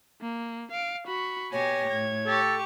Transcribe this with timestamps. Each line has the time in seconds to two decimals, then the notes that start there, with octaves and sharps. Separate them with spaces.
0.21 A#3
0.72 F5 D7
1.07 F#4 B5 C#6
1.52 B2 G4 C#5 G#5 A#6
1.89 A2 G#6
2.26 G4 A4 C#6